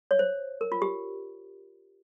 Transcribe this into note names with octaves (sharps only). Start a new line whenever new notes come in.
C#5
C5
A#4
F4
G4